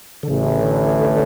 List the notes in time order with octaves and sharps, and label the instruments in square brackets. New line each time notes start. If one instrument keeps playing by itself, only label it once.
[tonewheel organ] D3
[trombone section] A1 A2 E3 [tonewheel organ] C#3
[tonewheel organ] D3